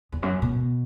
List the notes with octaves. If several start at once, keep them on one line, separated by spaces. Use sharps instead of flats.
E2
F#2
B2